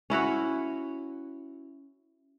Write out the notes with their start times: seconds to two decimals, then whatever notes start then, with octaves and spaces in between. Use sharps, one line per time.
0.10 C#4 E4 F#4 C#5